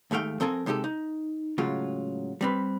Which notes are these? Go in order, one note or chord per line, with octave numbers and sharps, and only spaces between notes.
D#2 G#2 A3 F5 G5
F3 C4 A4 A#4 G#5
C3 G#3 D#4 G4 A4
D#4
A2 C#3 F#3 G#3 F4
G3 C4 B4